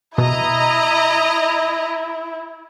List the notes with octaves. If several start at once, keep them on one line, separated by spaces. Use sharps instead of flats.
B2 E4 D#5 A#5